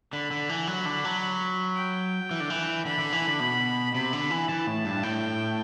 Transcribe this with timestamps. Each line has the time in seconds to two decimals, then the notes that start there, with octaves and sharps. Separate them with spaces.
0.13 D3 B5
0.31 D3
0.49 E3
0.67 F#3
0.86 D3
1.04 F#3
1.76 G5
2.31 E3
2.40 D3
2.50 E3
2.85 D3 B5
2.99 D3
3.13 E3
3.26 D3
3.40 B2
3.95 C3 B5
4.13 D3
4.31 E3
4.49 E3 A5
4.67 A2
4.85 G2
5.03 A2 G5